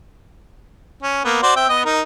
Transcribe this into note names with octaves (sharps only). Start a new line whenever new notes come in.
C#4
A#3 B3
F#4 C5 D5
C4 E5 G5
B3 D#5
D#4 A#4